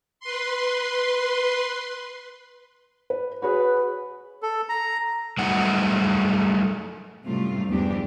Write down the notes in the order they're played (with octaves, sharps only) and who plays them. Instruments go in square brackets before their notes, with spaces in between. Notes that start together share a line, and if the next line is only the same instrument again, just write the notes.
[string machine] B4 C6
[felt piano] B4
[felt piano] F#4 G#4 C#5 [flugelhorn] B4
[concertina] A4
A#5
[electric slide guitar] F#3 G3 A3 D#4 F#5
[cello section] F#2 A2 C3 G3 A3 F4
E2 G2 F3 G#3 D4 G4